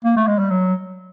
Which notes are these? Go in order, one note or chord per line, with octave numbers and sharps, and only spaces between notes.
A#3
A3
G#3
G3
F#3